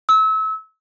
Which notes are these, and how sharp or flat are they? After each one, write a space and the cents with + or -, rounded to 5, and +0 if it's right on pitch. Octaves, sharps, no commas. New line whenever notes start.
E6 -30